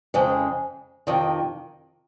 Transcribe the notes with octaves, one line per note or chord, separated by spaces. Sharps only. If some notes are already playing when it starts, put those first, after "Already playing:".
F2 C#3 G#3
F2 C3 D#3